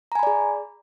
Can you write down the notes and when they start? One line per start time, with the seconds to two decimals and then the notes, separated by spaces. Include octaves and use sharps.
0.12 A#5
0.15 G#5
0.19 B5
0.23 D5
0.27 G#4